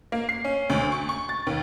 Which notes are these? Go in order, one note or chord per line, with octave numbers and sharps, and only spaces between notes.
A#3
C7
C#4
D2
C#6
C#6
A6
D#2